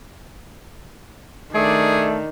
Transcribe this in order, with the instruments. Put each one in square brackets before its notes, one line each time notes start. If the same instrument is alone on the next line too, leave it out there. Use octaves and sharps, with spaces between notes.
[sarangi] D#3 [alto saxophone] A3 [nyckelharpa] D4 D5 [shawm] G#4